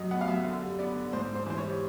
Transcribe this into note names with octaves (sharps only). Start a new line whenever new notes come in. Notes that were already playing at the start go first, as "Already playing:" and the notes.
Already playing: F#2 F#3 D#5
B3 F#5
F5
F#2 E5
D3
G3
B3 D5
D3
G#2 C5
G#2
C5
E3 C5
C#5
G3